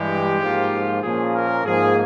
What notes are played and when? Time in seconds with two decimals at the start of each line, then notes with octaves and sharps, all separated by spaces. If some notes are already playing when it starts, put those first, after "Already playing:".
Already playing: G2 E3 G#3 G4
0.40 G#2 F3 A#3 F4
1.02 A#2 F3 A#3 C#4 G#4
1.35 A#4
1.65 G#2 F3 A#3 G#4